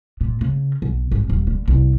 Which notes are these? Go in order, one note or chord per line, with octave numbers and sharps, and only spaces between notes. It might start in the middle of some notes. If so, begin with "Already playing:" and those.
A#2
C#3
B1
G#1
D#1
D3
C2